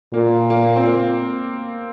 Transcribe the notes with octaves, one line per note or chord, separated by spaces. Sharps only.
A#2 A#3
A#3
C4
A#3